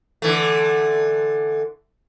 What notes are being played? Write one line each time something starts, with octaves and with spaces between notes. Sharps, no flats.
D3 E3 A3